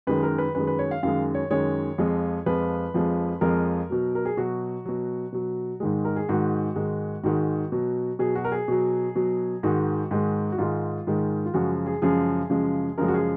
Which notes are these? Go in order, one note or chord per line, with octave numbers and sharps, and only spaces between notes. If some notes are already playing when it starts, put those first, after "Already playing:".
F#2 D#3 G#3 B4
A#4
B4
F#2 D#3 G#3 B4
B4
C#5
F5
F#2 D#3 G#3 F5
C#5
F#2 D#3 G#3 C#5
F2 F3 G#3
F2 F3 G#3 B4
F2 F3 G#3
F2 F3 G#3 A#4
B2 F#3
A#4
G#4
B2 F#3 F#4
B2 F#3
B2 F#3
G#2 D#3 G#3
A#4
G#4
G#2 D#3 G#3 F#4
G#2 D#3 G#3
G#2 D#3 G#3 F#4
B2 F#3
B2 F#3 G#4
F#4
A#4
G#4
B2 F#3
B2 F#3
G#2 D#3 G#3 F#4
G#2 D#3 G#3
F#4
G#2 D#3 G#3 F4
G#2 D#3 G#3
F4
F#2 C#3 F3 G#3 F#4
G#4
F#2 C#3 F3 G#3 G#4
F#2 C#3 F3 G#3
F#2 C#3 F3 G#3 A#4
F#4
G#4